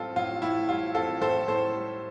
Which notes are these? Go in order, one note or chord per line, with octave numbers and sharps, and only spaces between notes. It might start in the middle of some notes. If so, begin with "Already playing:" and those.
Already playing: A2 G3 C4 F4 A4
A2 F4
A2 E4
G3 F4
C4 F4 A4
A2 A4 C5
A2 A4 C5
G3